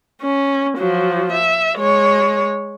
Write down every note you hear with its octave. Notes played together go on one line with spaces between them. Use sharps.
C#4
F3 F#3
E5
G#3 C#5